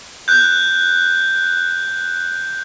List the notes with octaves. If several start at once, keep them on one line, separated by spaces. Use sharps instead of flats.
F#6 G6